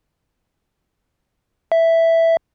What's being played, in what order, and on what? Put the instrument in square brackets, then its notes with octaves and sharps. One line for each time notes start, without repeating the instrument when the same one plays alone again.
[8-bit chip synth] E5